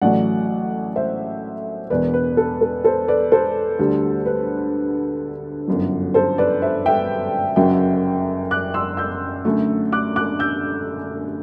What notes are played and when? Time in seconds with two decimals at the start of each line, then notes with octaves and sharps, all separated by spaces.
0.02 A1 A2 F#3 A3 D5 F#5
0.96 C5 E5
1.90 E1 E2 B2 B4 D5
2.14 B4
2.37 A4
2.61 A4
2.84 A4 C5
3.08 B4 D5
3.32 A4 C5
3.79 D2 D3 G3
4.26 B4
5.68 G1 F#2 D3 F#3
6.14 A4 C5
6.38 B4 D5
6.62 C5 E5
6.86 E5 G5
7.56 F#1 F#2 F#3 E5 G5
8.51 D6 F#6
8.74 C6 E6
8.97 E6 G6
9.45 F#2 D3 A3
9.92 D6 F#6
10.16 D6 F#6
10.39 E6 G6